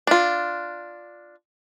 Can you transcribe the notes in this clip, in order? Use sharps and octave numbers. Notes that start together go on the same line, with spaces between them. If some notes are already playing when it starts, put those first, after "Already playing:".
D4 F4